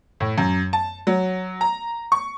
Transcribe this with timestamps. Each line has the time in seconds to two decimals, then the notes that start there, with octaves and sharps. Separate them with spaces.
0.20 A2
0.38 F#2
0.73 A5
1.07 F#3
1.61 A#5
2.12 C#6